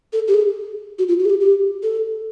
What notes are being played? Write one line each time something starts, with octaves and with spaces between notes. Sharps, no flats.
A4
G4
G#4
F#4
F4
F#4
G#4
G4
G4
A4